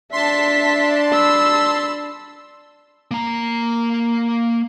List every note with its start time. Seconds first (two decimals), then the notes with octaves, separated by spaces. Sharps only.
0.13 D4 E5 A5 C6 B6
1.13 B5 E6
3.11 A#3 A#5